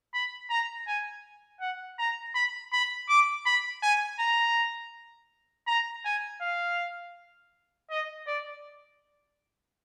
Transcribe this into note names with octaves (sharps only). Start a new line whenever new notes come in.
B5
A#5
G#5
F#5
A#5
B5
B5
D6
B5
G#5
A#5
A#5
G#5
F5
D#5
D5